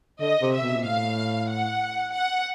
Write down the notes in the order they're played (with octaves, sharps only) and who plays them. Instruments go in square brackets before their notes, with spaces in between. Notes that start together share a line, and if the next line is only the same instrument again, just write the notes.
[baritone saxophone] D3 [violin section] D#5
[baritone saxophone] C3
[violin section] E5
[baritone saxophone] B2
A#2
[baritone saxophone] A2 [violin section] F5
[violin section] F#5
F#5